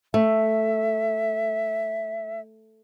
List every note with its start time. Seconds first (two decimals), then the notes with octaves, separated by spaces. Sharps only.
0.14 A3 E5